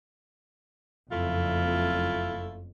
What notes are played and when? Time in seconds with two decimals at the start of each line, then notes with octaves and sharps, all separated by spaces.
1.11 F#1 F2 A3 E4 F4